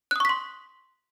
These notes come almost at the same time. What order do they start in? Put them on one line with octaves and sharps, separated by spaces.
F#6 D#6 C#6 B6 C6